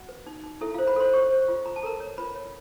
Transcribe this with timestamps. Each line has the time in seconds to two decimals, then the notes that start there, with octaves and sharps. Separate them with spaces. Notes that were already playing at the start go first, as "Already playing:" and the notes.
Already playing: F#4 F#5
0.09 B4
0.27 D#4
0.44 D#4
0.61 E4 A4 E5
0.74 F4 C5 F5
0.87 B4 B5
0.96 A4 C5 C6
1.13 C5 C#5 C#6
1.30 C5
1.48 F4
1.66 F4 A#5
1.76 A5
1.83 A4 A#4 A#5
2.00 C#5
2.18 F4 B4 B5
2.36 C#5